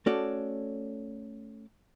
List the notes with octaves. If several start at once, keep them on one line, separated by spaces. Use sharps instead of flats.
A3 C#4 F#4 A4 C#5 D5